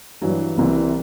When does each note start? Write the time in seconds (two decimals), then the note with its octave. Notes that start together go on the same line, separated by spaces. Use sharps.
0.22 G2 E3 F#3
0.57 C2 C3 E3